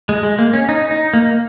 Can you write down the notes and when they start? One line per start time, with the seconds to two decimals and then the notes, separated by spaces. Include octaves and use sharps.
0.09 G#3
0.23 G#3
0.39 A#3
0.53 C#4
0.69 D#4
0.91 D#4
1.14 A#3